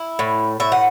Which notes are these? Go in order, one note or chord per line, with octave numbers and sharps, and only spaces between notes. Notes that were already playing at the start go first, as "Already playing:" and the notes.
Already playing: E4
A2
A2 E5
F#5